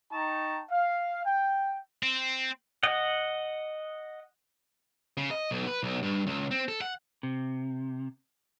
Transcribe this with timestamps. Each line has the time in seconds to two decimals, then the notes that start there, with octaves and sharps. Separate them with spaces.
0.12 D#4 G5 A5 A#5 C#6
0.70 F5
1.26 G5
2.03 C4
2.83 D#5 F#5
5.17 C#3
5.31 D#5
5.51 B1
5.67 B4
5.83 B1
6.03 G2
6.27 C#2
6.51 C4
6.68 A4
6.81 F#5
7.23 C3